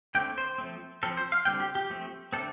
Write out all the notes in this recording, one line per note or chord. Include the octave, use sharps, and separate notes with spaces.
D3 A3 C4 G5
C5
F3 A3 C4
F3 C4 A4
C5
F5
D3 G3 C4 G5
G4
G4
F3 A3 C4
D3 A3 C4 A4